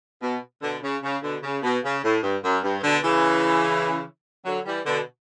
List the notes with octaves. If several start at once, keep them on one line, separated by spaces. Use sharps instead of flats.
B2
B2 D3
C#3
C#3
B2 D3
C#3
B2
C#3
A2
G2
F#2
G2
B2 D3
C#3 E3
D3 F#3
E3 G3
B2 D3